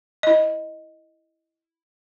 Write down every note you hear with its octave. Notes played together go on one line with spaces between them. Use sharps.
E4 D#5